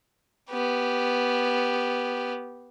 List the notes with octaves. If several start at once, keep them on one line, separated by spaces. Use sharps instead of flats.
B3 G4